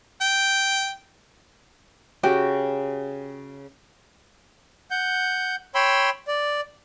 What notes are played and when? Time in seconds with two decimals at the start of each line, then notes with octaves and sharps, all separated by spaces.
0.21 G5
2.23 C#3 F#4 G4 G5
4.91 F#5 G6
5.75 C#5 G5 B5 C6 E6
6.28 D5